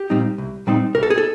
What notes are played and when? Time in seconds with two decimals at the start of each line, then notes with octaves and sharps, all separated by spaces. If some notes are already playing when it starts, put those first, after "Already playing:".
Already playing: G4
0.10 A#2 G3 C4 D#4
0.38 C2
0.67 A#2 G3 C4 D#4
0.95 C2 A#4
1.03 A4
1.10 G#4
1.18 A4